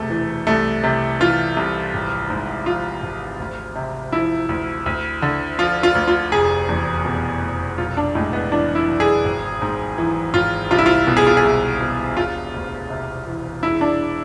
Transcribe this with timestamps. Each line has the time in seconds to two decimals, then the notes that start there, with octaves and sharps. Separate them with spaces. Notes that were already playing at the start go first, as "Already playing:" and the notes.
Already playing: E1 D2 C3 A3
0.10 E3
0.47 C2 A3
0.83 C3
1.20 E3 F4
1.57 C2
1.94 G#1
2.30 G#2
2.66 F3 F4
3.02 G#1
3.40 D2
3.76 C3
4.12 F3 E4
4.49 D2
4.86 D2
5.22 D3
5.59 F3 F4
5.83 F4
5.95 D2
6.08 F4
6.32 F1 G#4
6.69 E2
7.05 B2
7.42 F1
7.78 B1 F4
7.97 D4
8.15 A2 G#3
8.33 B3
8.52 E3 D4
8.75 E4
8.88 B1
9.00 G#4
9.25 G#1
9.62 G#2
9.98 E3
10.34 G#1 F4
10.71 C2 F4
10.78 E4
10.86 F4
11.07 B2
11.17 G#4
11.27 F4
11.37 G#4
11.44 C2
11.81 B2
12.17 E1 F4
12.54 D2
12.90 C3
13.27 E3
13.63 E1 E4
13.81 D4